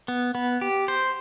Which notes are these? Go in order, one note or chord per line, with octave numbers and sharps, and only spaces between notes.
B3
B3
G4
C5